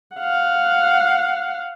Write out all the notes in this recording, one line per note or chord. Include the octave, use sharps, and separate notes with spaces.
F5 F#5